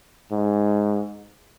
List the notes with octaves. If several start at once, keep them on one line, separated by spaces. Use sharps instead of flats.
G#2